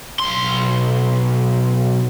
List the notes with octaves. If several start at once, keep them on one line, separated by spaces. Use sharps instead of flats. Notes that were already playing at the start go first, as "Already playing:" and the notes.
B1 C6